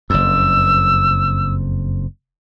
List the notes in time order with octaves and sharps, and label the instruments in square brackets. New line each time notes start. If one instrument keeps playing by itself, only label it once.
[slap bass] F#1 F2 [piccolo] E6